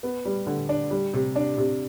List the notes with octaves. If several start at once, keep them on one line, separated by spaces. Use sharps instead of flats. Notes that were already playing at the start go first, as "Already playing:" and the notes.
B3
G3
D3
D4
G3
C3
D4
C3